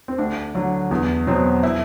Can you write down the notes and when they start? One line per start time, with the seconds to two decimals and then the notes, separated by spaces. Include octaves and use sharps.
0.08 C4
0.18 D2 D4
0.55 D3 F#3
0.91 E2
1.27 B2 F#3 C4
1.63 E4